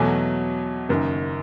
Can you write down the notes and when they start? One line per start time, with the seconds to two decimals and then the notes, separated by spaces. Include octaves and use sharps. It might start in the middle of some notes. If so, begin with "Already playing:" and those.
Already playing: E2 B2 F#3 A3 G#5
0.89 F#1 F#2 D#3